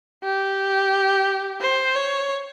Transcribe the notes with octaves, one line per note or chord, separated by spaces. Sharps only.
G4
C5
C#5